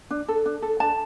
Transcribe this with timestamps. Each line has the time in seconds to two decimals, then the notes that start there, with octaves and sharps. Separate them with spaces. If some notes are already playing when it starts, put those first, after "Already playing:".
0.11 D4
0.28 A4
0.46 D4
0.62 A4
0.80 D4 A5